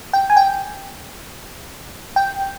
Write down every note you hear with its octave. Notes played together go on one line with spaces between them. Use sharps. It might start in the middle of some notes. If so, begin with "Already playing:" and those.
G5
G#5
G5
G5